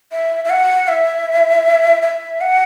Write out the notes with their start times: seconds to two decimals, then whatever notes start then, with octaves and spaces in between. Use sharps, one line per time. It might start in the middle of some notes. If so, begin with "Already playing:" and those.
0.12 E5
0.45 E5
0.50 F#5
0.88 E5
2.02 E5
2.41 F#5